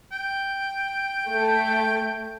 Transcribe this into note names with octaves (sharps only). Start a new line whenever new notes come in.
G5
A3